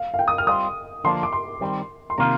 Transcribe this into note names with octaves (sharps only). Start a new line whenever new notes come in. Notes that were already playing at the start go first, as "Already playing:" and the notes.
Already playing: F5
F5
G5
D#6
F6
G3 C4 F4 D#6
D3 F3 A#3 D4 C6
D6
C6
D#3 G3 C4
C6
C3 D#3 A#3 F4 A#5